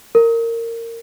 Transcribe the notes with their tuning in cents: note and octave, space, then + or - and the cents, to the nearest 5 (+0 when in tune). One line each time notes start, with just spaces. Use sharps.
A#4 -20